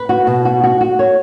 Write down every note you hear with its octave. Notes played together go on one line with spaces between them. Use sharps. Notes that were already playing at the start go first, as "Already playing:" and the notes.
Already playing: B4
F#4
B2
F#4
F#4
F#4
C#5